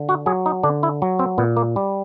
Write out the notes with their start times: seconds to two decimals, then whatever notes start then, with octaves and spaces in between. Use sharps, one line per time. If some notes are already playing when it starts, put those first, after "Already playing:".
Already playing: D3
0.09 F#4
0.26 F#3 G#4
0.46 D#4
0.63 D3 D4
0.83 E4
1.02 F#3
1.19 C4
1.38 A#2 B3
1.57 A#3
1.76 G3